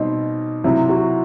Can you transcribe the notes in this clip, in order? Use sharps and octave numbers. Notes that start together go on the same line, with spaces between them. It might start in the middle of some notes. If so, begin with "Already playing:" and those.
Already playing: B2 G3 C4 D#4
C3 F#3 C4 E4
F#4